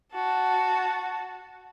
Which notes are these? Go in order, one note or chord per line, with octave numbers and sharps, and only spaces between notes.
F#4 A5